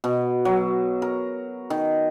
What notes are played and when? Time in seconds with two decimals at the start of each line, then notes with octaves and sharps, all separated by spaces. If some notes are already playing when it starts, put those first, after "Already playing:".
0.04 B2
0.45 F#3
1.02 A#4
1.70 D#3